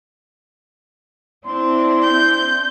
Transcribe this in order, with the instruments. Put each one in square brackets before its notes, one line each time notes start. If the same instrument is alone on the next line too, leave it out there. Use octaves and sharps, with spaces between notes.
[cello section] C4 D4 E4 [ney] C6
[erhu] G6